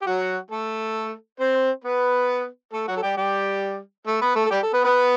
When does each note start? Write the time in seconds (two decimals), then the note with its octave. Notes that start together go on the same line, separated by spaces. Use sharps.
0.02 G4
0.06 F#3 F#4
0.51 A3 A4
1.40 C4 C5
1.84 B3 B4
2.73 A3 A4
2.88 F#3 F#4
2.97 A4
3.03 G3 G4
3.17 G3 G4
4.07 A3 A4
4.21 B3 B4
4.36 A3 A4
4.46 A4
4.51 G3 G4
4.63 A4
4.74 B3 B4
4.85 B3 B4